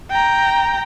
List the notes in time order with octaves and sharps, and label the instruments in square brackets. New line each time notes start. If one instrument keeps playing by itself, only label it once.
[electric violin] G5 A#5